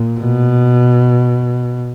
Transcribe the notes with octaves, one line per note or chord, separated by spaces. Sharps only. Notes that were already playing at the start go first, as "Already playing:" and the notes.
Already playing: A#2
B2